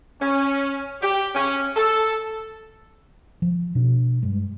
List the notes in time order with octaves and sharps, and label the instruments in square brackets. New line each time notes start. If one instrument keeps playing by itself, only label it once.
[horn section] C#4
G4
C#4
A4
[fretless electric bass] F3
B2 D4
G2 G#3